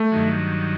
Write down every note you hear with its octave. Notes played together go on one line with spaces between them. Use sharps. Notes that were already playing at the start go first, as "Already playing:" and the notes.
Already playing: A3
G2 D#3 F#3